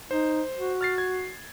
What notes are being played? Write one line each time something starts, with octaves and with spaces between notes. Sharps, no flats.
D#4 C5
F#4
F6 A6 C7
G#6